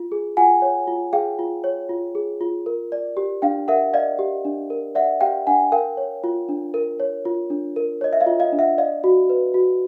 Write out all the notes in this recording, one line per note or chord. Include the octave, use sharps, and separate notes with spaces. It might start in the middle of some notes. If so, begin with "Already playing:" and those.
Already playing: F4
G#4
F4 F#5 G#5
C#5
F4
G#4 F5 G5
F4
C#5
F4
G#4
F4
A#4
D5
G4
D4 F5 G5
A#4 E5 F#5
D5 D#5 F5
G4
D4
A#4
D5 E5 F#5
G4 F5 G5
D4 F#5 G#5
A#4 F5 G5
C#5
F4
D4
A#4
C#5
F4
D4
A#4
C#5 D#5
E5
D#5 F5
F4
D#5 F5
D4
E5 F#5
D5 D#5 F5
F#4
B4
F#4